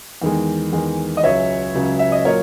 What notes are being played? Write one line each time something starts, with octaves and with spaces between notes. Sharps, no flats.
E2 D#3 G#3
E2 D#3 G#3
D#5
C#2 C#3 F#3 C#5 E5
C#2 C#3 F#3
E5
D#5
A#2 F#3 A#4 C#5